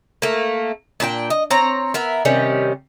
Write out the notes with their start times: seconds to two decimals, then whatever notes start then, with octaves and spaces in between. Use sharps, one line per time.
0.22 A3 A#3
1.00 A#2 D4 A4 G5
1.30 D#5
1.51 C4 C#5 A#5
1.94 B3 A#4 E5
2.25 C3 D#3 G3 C#4